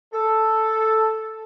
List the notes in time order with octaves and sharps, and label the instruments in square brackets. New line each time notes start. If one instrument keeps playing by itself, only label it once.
[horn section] A4